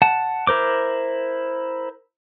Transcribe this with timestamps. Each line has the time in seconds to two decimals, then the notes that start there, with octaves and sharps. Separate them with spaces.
0.02 F#5 A5
0.47 E4 A#4 C5 D6